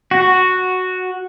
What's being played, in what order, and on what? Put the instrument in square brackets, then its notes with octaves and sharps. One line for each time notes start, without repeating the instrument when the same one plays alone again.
[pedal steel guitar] F#4